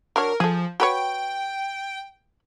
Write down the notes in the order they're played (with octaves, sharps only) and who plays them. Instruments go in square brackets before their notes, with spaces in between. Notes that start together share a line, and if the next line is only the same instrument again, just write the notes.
[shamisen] F#3 D4 C#5 [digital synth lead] A#4
[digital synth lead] F3 [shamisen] G#4 A4
[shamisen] F#4 B4 C#5 [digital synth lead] G5